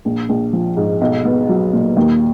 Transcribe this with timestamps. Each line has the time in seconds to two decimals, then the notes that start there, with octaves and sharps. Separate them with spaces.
0.05 A#1
0.29 A#1
0.53 F3
0.77 G#2
1.01 B1
1.25 B3
1.49 F#3
1.73 A#2
1.96 D#2